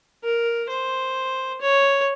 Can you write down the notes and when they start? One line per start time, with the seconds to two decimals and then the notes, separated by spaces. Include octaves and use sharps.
0.24 A#4
0.69 C5
1.61 C#5